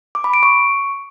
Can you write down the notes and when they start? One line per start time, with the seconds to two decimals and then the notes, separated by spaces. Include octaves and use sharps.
0.15 D6
0.24 B5
0.34 D7
0.43 C#6